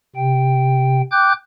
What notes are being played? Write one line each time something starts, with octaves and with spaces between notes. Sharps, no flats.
C3 G5
G5 D6 F#6 G6